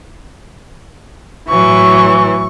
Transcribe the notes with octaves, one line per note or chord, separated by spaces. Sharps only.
A2 E3 F#3 C#6